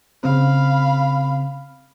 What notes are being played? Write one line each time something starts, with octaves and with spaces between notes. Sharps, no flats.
C#3 C4 F5 B5